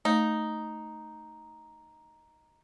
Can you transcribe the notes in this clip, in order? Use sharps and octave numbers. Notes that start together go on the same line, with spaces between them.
A3 D#4